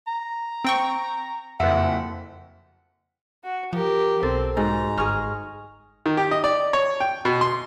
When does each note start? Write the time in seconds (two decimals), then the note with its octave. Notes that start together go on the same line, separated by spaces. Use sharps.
0.07 A#5
0.64 C4 G5 C#6
1.60 F#1 F2 E5 F#5
3.44 F#4
3.73 F3 G4 A#4
4.23 B1 C4 A4
4.57 G#2 F#4 A#5
4.98 G1 G#4 C#6 F6
6.06 D#3
6.17 G4
6.31 D#5
6.44 D5
6.73 C#5
7.00 G5
7.25 B2
7.41 C6